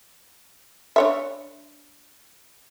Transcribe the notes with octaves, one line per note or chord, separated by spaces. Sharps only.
D4 C#5 E5